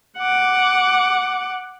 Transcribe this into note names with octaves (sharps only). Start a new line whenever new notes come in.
F#5 D6